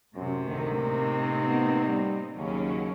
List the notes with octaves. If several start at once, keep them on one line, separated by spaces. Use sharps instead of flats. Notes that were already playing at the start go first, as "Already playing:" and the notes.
F#2 A2 C3
D2 D3 D#3 A#4
A#3 C4 D#4
B3
G3
D#2 C#3 F#3 C#4